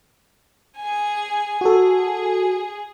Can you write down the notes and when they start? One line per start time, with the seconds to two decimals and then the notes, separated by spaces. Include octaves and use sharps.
0.79 G#4 G#5
1.61 F#4 G#4 A4